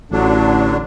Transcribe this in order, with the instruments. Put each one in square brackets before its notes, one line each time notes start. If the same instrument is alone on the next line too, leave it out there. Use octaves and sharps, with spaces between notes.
[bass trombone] A1 [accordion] D3 F#3 D4